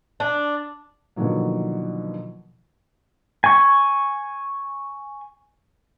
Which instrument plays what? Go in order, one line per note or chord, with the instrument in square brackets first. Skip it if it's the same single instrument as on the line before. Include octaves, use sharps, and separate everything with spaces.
[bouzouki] D4
[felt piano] B2 D3 D#3 F3 F#3 A#3
[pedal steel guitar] G#5 C#6